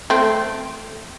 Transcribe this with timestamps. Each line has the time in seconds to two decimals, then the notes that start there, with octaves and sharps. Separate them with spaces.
0.10 A3 C4